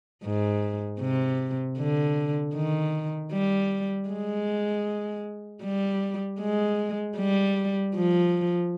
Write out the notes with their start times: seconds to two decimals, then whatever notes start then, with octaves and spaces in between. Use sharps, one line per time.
0.24 G#2
1.00 C3
1.78 D3
2.55 D#3
3.32 G3
4.09 G#3
5.64 G3
6.40 G#3
7.17 G3
7.95 F3